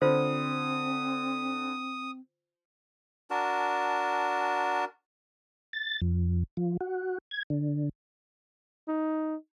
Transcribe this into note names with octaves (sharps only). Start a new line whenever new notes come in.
D3 C4 F4 C5 D#6
D4 F#4 A#4 A5
A6
F2
F3
F#4
G#6
D3
D#4